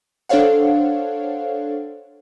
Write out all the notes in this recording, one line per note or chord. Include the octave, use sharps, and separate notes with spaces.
D4 A4 C5 C#5 F5 F#5